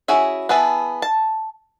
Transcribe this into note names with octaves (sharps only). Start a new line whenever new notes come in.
C#4 E4 F#4 G#4 E5
B3 E4 G#4 E5 A5
A5